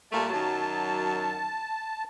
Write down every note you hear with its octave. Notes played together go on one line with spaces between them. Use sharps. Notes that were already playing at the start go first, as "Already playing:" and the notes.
A#2 G3 A3 A5
F#2 D#3 F#3